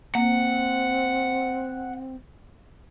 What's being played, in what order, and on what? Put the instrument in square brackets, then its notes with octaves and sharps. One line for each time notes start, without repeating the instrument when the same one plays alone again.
[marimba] A#3 [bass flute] C4 [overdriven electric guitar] F#5